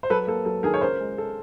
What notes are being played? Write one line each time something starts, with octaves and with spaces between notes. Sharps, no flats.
C5
F#3 A4 B4
A#3 A4
F#3 A4
D#3 G#4 A#4
C#5
C#2 A#4 C5
G#3
G#3 A4